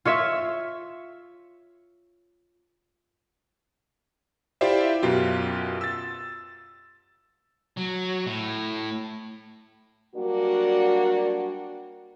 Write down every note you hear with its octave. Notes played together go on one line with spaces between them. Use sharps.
F4 C#5 E5 E7
E4 F4 G4 C5 D5 E5
F#2 B2 F4 G4
E6 A6
F#3
A2
F#3 G3 A#3 D4 F#4